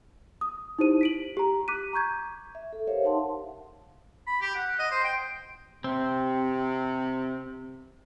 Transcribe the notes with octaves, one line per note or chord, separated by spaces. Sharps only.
D#6
D#4 E4 G4 C5 D#7
B6 D7 F#7
G4 A#5
D6 F#6 B6 D#7
A#5 C#6 G6 G#6
E5
A4
G4 A#4 C5 C#5 E5 F5
D#4 F5 F#5 A5 C6
B5
G4
F#5
D#5
C5
G5
C3 C4